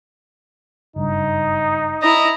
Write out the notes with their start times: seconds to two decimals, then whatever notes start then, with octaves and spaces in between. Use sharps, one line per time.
0.96 F#1 G2 D#4
2.02 E4 D#5 A#5